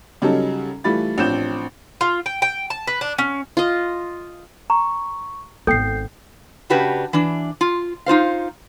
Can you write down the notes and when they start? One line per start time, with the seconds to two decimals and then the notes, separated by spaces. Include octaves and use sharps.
0.22 C#3 F#3 G3 C#4 D#4 A4
0.84 E3 G3 A3 F4 B5 A6
1.18 A1 F3 C4 D4 G6 E7
2.01 F4
2.26 G5
2.42 G5
2.70 A5
2.87 B4
3.01 D4
3.18 C#4
3.57 F4 D#5
4.70 A#5 C#6
5.67 G#1 B3 A4 G5 G6 C7
6.70 C#3 D4 F#4 G4 B4
7.13 E3 D4
7.61 F4
8.06 D#4 F4 C5 F5